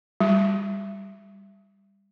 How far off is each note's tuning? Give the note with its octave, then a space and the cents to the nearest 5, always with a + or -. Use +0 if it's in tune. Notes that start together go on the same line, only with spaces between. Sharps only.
G3 +15